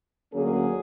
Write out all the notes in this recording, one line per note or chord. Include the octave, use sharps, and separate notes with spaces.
D2 D3 F#3 A#3 C#4 G#4